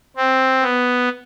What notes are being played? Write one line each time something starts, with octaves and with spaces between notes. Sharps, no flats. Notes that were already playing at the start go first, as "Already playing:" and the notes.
C4
B3